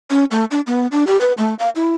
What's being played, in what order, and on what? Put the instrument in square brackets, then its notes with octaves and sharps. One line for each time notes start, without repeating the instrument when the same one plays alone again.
[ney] C#4
A3
D4
B3
D4
G4
B4
A3
F5
E4